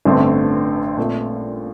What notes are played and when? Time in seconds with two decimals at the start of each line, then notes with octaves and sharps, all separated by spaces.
0.05 A1 G2 D3 A3 C4
0.97 A#2 A3 C4